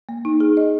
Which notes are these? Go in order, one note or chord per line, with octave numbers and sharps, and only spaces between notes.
A#3
D#4
G#4
D#5